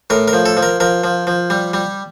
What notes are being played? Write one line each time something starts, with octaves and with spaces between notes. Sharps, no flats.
A2 A#4
A#4
F3
A4
F3
A#4
F3 A#4
F3
F3
G3
G3